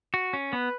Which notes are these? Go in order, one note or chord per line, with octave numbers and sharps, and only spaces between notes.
F#4
C#4
B3 B4